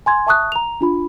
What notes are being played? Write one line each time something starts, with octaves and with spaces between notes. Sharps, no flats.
G#5 C6 G#6
E5 A5 C#6 D#6 F#6
A#5 F7
D4 F4 B5